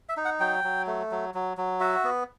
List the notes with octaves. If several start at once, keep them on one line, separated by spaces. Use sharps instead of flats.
E5
D#4
F#5
F#3 G5
F#3
A3
F#3
F#3
F#3
F#4 E5
B3